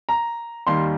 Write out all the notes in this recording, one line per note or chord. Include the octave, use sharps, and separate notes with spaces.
A#5
D#2 D#3 G3 A#3 C6